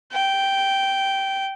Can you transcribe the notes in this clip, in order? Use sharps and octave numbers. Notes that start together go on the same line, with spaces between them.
G5